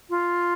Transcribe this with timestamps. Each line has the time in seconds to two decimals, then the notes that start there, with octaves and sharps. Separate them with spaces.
0.10 F4